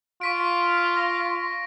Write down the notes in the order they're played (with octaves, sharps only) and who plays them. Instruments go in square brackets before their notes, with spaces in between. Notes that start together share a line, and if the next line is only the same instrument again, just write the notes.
[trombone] F4 [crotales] C#6 B6 D7
[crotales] A#6